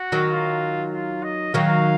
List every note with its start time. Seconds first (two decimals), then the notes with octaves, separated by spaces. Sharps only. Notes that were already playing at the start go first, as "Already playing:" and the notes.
Already playing: F#4
0.12 D#3 F#3
0.32 F4
0.93 F4
1.23 D#5
1.54 D#3 F#3 F5